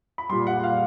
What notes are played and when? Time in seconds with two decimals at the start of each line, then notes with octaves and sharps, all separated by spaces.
0.18 B5
0.29 A#2 G3 C6
0.47 F#5
0.64 F5